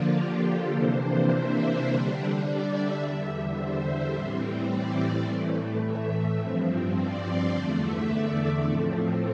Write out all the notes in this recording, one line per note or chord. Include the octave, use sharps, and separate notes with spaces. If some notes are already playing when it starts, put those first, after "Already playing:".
Already playing: D3 F3 A#3 D4 F4
G4
A4
C3 E3 A#3 D4 C5
E5
D3 G3 D4
D5
E5
E2 D3 G3 E5
C5
A2 E3 G3 C4
D5
A2 E3 A3
E5
G2 F3 C4
D5
C5
E2 D3 A3 D5
E5
D5
A2 F3 A3 C4